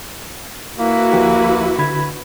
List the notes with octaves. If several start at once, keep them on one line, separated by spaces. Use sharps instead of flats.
A#3 E4 F#4 B4
D2 F3 G4
D3 B5 G#6